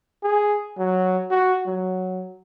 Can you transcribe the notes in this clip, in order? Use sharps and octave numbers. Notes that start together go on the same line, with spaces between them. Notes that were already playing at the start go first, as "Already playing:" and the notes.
G#4
F#3
F#4
F#3